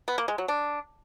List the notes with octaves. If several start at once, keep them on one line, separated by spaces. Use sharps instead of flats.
B3
A#3
G#3
F#3
D4